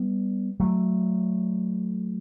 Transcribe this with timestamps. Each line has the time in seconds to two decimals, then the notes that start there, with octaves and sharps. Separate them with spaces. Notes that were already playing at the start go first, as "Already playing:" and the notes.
Already playing: G3 B3
0.60 F#3 A3